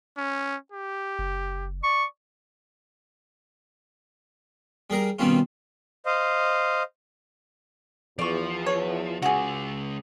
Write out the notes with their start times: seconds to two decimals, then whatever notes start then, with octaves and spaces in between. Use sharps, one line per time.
0.17 C#4
0.72 G4
1.19 F#1
1.84 D5 C#6
4.90 G3 G#4 A#4 A#5
5.19 B2 D#3 G3 C4 C#4 F4
6.06 C5 D#5 F5
8.19 E2 F3 D5 C#6
8.66 C#5
9.22 C#3 G#3 F#4 G#4